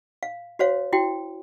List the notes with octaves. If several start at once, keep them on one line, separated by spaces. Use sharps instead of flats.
F5
F#4 C5 C#5 F5
E4 F#4 G5